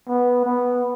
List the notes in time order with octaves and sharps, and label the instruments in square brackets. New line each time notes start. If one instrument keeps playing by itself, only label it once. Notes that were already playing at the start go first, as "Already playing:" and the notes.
[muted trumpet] B3
B3